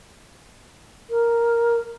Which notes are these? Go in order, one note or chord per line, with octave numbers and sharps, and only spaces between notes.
A#4